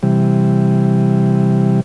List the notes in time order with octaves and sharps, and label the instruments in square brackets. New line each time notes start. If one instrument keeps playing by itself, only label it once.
[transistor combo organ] C3 E3 G3